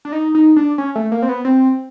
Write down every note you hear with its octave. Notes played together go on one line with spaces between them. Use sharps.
D4
D#4
D#4
D4
C#4
A3
A#3
C4
B3
C4